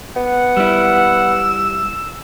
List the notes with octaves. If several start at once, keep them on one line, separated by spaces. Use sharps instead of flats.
B3 F#5
G3 E4 E6